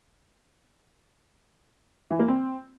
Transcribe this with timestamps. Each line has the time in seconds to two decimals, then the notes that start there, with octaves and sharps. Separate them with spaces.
2.10 E3
2.19 A#3
2.28 C4